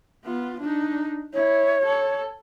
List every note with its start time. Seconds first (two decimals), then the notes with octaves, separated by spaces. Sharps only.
0.25 B3 F4
0.60 D4 D#4
1.34 E4 C#5
1.86 A4